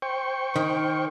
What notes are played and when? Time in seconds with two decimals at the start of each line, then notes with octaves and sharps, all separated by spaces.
0.02 C5 G5 C#6
0.56 D#3